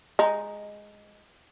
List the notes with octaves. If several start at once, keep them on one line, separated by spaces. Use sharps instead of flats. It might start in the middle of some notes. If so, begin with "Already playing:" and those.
G#3 D#4